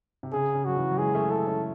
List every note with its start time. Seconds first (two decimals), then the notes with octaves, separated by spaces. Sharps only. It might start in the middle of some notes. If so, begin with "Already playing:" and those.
0.23 C3
0.33 C#3 G#4
0.54 C#3
0.65 F#3 F#4
0.77 C#3 E3
0.91 F#3
0.97 E3 G#3 G#4
1.14 A3 C#4
1.30 C#4 E4 A4
1.47 C#4 E4